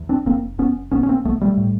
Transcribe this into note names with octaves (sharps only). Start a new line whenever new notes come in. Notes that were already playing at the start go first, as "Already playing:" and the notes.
Already playing: E2
C4 D4
F1 A#3 C4
F1 B3 C#4
A#1 B3 C#4
C#4
A#3 C4
A#1 A3 B3
G3 A3
A2